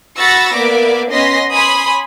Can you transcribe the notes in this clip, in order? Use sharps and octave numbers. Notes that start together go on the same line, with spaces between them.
F#4 B5 C#6 E6 A6 A#6
A#3 B3 D5 E5 D6
B3 C#4 D#5 C6 A#6 B6
C#5 G#5 B5 C6 D#6